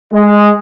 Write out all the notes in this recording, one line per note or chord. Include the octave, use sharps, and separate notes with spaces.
G#3